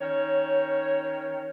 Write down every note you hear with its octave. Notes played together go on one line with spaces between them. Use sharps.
D#3 C#4 C#5